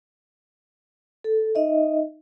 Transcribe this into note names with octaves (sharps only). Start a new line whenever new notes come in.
A4
D#4 D#5 E5